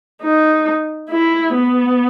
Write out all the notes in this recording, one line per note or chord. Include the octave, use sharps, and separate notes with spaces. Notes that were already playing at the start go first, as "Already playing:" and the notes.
D#4
E4
B3